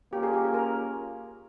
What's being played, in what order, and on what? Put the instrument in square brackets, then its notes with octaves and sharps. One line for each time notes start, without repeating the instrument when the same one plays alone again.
[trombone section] A#3 C#4 F4 [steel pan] G4
[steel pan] G#4
G4
G#4
A#4